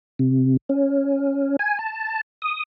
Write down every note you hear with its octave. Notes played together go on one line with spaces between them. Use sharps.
C3
C#4
G#5
A5
D#6